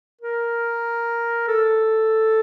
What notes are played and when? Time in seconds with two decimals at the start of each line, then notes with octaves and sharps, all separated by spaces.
0.21 A#4
1.48 A4